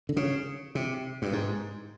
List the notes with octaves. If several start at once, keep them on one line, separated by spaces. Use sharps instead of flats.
D3
C#3
C3
G2
G#2